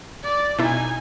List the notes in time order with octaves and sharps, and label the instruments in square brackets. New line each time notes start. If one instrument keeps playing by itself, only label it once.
[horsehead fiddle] D5
[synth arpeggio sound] B2 E4 [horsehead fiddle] D#4 G#5